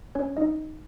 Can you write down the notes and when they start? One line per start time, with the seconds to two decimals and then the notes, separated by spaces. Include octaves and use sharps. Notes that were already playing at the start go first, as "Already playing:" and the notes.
0.15 C#4 C#5
0.37 D#4 D#5